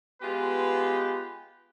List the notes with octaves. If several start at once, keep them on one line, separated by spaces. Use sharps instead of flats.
G#3 B3 F4 G4 B4